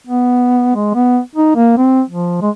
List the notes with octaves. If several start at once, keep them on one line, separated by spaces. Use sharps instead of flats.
B3
G#3
B3
D#4
A#3
C4
F3
G#3